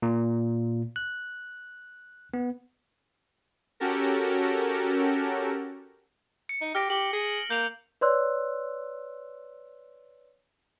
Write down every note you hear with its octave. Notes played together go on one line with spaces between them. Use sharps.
A#2
F#6
B3
C#4 F#4 G4 A4 A#4
C#7
D#4
G4 F6 A#6 D7
G4 F#7 G7
G#4
A#3 G6 F7 F#7
B4 C#5 D5 C6 E6 F#6